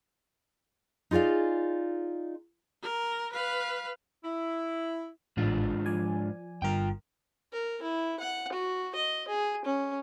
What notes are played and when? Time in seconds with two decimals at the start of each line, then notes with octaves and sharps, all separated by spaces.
1.11 D#4 F4 G#4 D5 F5
2.82 A#4
3.32 B4 F5
4.24 E4
5.37 A1 G#2 D4 F4
5.86 F3 D5 G#5
6.62 G1 G2 F4 A#4 G5
7.53 A#4
7.83 E4
8.20 F#5
8.52 F#4
8.95 D#5
9.28 G#4
9.65 C#4